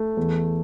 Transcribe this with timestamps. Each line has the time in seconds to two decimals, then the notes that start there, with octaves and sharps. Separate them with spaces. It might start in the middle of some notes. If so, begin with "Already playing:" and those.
Already playing: A3
0.17 E2